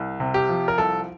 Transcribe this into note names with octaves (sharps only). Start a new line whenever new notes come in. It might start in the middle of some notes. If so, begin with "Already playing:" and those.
Already playing: C2
C3
G4
F3
A#4
C2 A4